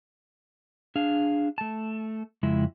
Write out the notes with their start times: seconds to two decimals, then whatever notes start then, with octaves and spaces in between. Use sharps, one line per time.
0.96 D4 G#4 F5
1.58 A3 A5
2.43 F2 C#3 G#3 E4